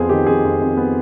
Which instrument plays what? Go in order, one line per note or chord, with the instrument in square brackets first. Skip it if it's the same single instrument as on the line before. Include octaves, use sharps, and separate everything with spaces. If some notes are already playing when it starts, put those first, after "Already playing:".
Already playing: [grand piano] F2 B3 G#4 C5
D#3 G4
F2 G#4
F2
F2
B3